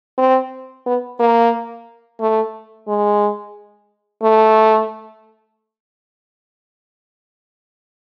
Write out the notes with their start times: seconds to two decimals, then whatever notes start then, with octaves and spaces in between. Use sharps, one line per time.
0.18 C4
0.86 B3
1.19 A#3
2.20 A3
2.88 G#3
4.23 A3